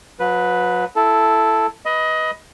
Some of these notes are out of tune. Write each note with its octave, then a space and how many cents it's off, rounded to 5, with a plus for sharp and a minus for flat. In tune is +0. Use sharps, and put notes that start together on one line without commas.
F#3 -35 B4 +0
E4 +15 A4 +0
B4 -5 D#5 +20 B5 +0